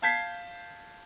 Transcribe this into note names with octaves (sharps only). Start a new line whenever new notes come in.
F5 A5 G6 G#6 B6 C7